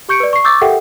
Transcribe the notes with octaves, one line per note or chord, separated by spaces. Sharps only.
G4 C#6 G6 C#7 D7
B4 D5
C#6 C7
C#6 D6 E6 G6 A6
G4 A4 A#4 E5 F#5 G5